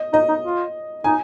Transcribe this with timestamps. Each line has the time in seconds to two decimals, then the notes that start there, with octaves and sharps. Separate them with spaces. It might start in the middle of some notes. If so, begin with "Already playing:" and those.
Already playing: D#5
0.13 D#4 D#5
0.28 D#4
0.44 F4
1.04 D#4 G#5